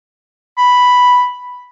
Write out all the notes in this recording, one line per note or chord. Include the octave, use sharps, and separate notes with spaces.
B5